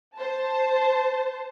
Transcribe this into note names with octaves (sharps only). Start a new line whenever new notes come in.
C5 A5